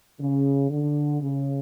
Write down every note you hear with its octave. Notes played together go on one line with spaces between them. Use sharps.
C#3
D3
C#3